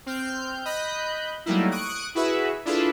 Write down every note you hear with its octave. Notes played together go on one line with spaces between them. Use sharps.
C4 F6 G6
D#5 B5 F#6 G6
F#3 G3 A3 A#3 D#4 E4
C#6 D#6 F#6 D7
E4 F#4 G#4 B4 E5
D4 E4 F4 G#4 A4 B4